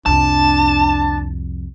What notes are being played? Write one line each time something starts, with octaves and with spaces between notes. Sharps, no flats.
C2 F2 D4 A5